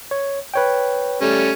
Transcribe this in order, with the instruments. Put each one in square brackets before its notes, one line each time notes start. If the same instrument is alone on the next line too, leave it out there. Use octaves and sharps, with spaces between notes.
[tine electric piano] C#5
B4 C#5 G5
[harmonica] G3 A3 C#4